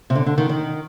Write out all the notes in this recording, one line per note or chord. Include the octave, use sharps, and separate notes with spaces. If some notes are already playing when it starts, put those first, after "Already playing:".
C3
D3
D3
D#3
D#3